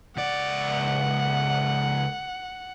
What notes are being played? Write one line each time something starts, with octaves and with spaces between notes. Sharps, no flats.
C#2 D5 F#5